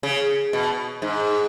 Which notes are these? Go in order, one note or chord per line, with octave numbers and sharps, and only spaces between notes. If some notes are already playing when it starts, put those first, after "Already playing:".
C#3
B2
G#2